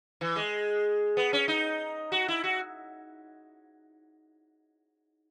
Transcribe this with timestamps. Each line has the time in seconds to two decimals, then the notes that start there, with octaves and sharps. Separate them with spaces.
0.21 E3
0.36 G#3
1.17 B3
1.33 C#4
1.48 D#4
2.12 F#4
2.28 E4
2.44 F#4